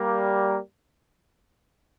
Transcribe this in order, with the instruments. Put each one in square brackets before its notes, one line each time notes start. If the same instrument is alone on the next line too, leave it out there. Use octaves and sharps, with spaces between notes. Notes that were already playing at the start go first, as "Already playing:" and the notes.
Already playing: [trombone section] G3 A#3